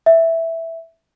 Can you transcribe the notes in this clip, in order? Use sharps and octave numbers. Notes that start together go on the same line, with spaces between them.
E5